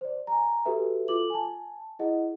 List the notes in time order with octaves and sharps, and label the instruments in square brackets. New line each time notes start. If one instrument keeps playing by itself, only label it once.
[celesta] C5 D5
G#5 A#5
F#4 G4 A4 B4 E5
F4 A4 D6 F#7
G#5 A5
E4 G#4 D#5 F#5